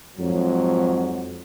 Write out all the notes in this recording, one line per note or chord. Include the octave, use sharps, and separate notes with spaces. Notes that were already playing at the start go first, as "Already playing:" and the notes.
F2 G#2 F#3